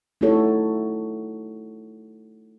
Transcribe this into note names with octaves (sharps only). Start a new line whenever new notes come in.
A3 D#4 E4 F#4 A4 C#5